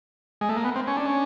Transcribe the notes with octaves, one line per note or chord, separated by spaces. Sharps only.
G#3
A3
A#3
B3
C4
C#4
D4
C#4